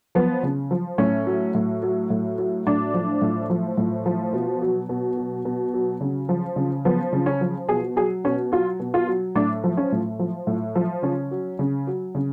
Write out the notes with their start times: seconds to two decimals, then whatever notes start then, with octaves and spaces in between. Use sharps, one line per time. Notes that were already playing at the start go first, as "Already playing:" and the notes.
0.15 F3 B3
0.43 C#3
0.71 F3
0.98 A2 C#4
1.27 F#3
1.55 A2
1.83 F#3
2.10 A2
2.38 F#3
2.67 A2 D4
2.94 F3
3.22 A2
3.50 F3
3.77 A2
4.06 F3
4.33 B2
4.62 F#3
4.89 B2
5.17 F#3
5.45 B2
5.74 F#3
6.01 C#3
6.29 F3
6.56 C#3
6.85 F3 B3
7.13 C#3
7.26 C#4
7.41 F3
7.68 B2 G#4
7.96 F#3 G#4
8.24 B2 C#4
8.52 F#3 F4
8.80 B2
8.94 F4
9.07 F#3
9.35 A2 D4
9.64 F3
9.77 C#4
9.92 A2
10.19 F3
10.47 A2
10.75 F3
11.03 C#3 C#4
11.31 F#3
11.59 C#3
11.87 F#3
12.15 C#3